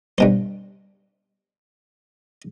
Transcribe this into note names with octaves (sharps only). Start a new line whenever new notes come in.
G2 B2 C5